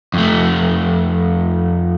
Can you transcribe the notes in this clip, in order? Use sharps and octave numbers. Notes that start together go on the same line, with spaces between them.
F2 A3